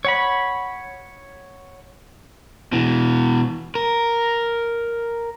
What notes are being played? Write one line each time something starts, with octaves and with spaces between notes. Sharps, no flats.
C#5 F#5 B5
B2 E3
A#4